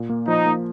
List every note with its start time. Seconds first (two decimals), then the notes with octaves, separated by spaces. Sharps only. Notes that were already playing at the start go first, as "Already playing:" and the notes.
Already playing: A#2
0.09 A#3
0.28 F3 D#4
0.46 A#3